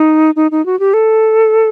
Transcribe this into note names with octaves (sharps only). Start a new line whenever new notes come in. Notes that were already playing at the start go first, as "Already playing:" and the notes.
Already playing: D#4
D#4
D#4
F#4
G4
A4